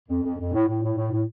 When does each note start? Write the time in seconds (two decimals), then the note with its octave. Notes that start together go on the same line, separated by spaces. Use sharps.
0.09 F2
0.23 F2
0.38 F2
0.53 A2
0.68 A2
0.82 A2
0.96 A2
1.11 A2